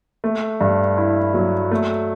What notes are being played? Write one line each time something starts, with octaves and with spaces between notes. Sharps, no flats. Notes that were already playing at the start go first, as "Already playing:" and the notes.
A3
G2
E4
F#3
A3